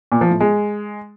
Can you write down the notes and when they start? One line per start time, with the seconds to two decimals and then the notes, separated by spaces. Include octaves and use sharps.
0.12 A#2
0.21 F3
0.31 A2
0.40 G#3